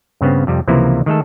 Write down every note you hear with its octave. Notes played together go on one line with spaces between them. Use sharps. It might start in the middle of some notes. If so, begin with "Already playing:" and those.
G2 C#3 B3 C4
F2 C3 G3
C#2 C3 E3 F3 A#3 E4
D#3 G#3 A3 A4